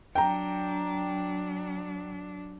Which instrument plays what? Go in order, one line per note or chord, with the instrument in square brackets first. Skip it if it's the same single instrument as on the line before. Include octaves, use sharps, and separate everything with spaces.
[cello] F#3 D4 [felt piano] G5 A#5